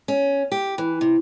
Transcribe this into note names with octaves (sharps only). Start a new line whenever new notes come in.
C#4
G4
E3
C3